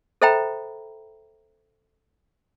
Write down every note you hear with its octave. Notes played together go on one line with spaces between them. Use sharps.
A4 C5 E5 G5 A#5 B5